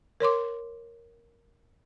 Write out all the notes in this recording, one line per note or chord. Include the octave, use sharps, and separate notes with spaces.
A#4 C#5 C6 D6